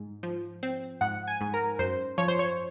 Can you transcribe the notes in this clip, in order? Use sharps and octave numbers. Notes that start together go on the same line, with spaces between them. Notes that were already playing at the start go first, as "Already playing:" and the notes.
Already playing: G#2
F3
C4
G#2 F#5
G#5
G#2
A#4
F#2 C5
F3 C#5
C5
C#5